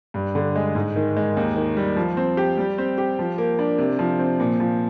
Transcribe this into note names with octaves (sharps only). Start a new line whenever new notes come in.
G2
D3
G#3
G#2
D#3
G#3
D#2
D#3
G3
F3
C4
G4
G3
C4
G4
F3
A#3
D4
C3
F3
C4
A#2
F3